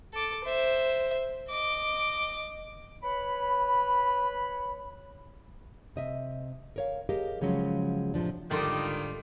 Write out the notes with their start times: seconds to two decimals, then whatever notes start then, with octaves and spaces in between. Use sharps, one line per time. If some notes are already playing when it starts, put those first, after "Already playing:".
0.13 A4 D6
0.43 C5 E5
1.50 D#5 D6
3.03 B4 C#5 B5
5.96 C3 D#5 E5
6.76 A#4 C#5 F5
7.09 G4 G#4 A#4 D#5 F5
7.41 C#3 F3 F#3 G#3 C#4
8.14 A2 C3 F3 D4
8.51 G#2 D3 D#3 G3 F4 D5 C6 D6